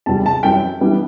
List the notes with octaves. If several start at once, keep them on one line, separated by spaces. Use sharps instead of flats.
E2 C3 G3 C4 A5
A5
F#2 E3 G3 C4 G5
E3 G3 B3 D4